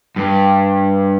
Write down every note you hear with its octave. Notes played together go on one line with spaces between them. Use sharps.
G2